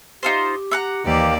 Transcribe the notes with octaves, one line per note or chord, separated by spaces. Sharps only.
D#4 F4 G4 C5
E5 F#5 A#5
D#2 E3 A#3 G4 D5